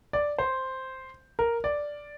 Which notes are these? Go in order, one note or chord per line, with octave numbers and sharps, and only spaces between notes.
D5
C5
A#4
D5